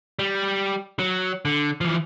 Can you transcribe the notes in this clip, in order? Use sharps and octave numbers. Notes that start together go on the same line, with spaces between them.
G3
F#3
D3
E3 F3